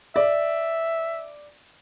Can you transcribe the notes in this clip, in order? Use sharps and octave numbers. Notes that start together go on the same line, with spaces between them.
D5 E5